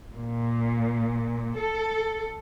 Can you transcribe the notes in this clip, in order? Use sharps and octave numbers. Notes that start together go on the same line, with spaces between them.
A#2
A4